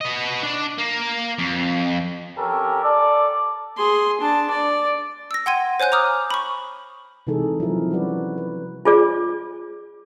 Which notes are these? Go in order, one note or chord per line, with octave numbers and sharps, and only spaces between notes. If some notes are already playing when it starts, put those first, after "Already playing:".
B3 D#5
D4 D5
A#3
F2
C#4 G4 A4 A#4
A4 D5
G#4 C6
D4 A5
D5
E6 A#6
F#5 G5 C6 G#6 D#7
C5 C#5 G#5 F#6 G6
A#5 D6 D#6 F6
B5 C#6
C3 E3 G#3 D#4 G#4 A4
F3 F#3 C4 E4 A#4
G3 C#4 F#4 B4 D5
B4
F4 G#4 D5